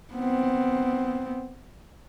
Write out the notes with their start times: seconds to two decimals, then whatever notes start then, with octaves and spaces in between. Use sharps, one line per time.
0.14 B3 C4